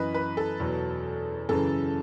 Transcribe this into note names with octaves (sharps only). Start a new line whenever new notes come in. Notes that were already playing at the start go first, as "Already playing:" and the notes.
Already playing: F#2 E3 B4 D#5
B4
A4
E2 B2 F#3
F#2 C#3 E3 A4